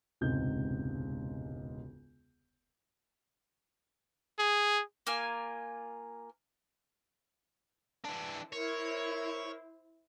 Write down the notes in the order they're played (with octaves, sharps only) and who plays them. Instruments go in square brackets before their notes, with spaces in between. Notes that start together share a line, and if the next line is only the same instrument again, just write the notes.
[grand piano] E1 C#2 G#2 C3 G6
[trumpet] G#4
[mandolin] A#3 F4 G#5
[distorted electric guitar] E3 D4
[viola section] E4 C5 [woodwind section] A#4 [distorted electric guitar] C#5